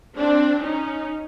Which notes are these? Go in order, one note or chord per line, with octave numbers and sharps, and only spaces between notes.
C4 D4
C#4 D#4